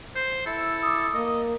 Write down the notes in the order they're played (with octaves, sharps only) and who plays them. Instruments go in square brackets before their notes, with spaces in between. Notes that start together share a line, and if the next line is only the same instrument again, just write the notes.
[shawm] C5 [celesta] G6
[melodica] E4 [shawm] A4
[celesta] D6 D#6
[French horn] A#3 [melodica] D#5